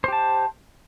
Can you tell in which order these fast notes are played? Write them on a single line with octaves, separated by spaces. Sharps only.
C5 G4 A5